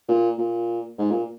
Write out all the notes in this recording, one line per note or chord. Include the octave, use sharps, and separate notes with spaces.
A#2
A#2
G#2
A#2